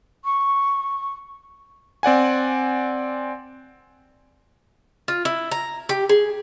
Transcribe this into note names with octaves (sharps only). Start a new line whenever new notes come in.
C#6
C4 D5 F#5 G#5
F4
E4
A#5
G4
G#4